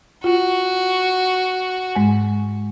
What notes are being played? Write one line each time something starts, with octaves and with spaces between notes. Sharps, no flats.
F4 F#4
G#2 G#3 G#5